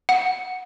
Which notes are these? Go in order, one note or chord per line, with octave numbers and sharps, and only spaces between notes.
F#5